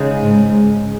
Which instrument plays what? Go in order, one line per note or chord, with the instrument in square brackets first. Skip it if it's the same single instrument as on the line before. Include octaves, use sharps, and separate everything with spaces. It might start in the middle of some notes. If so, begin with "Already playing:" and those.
Already playing: [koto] C#3 G#3 D#4
[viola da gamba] G#2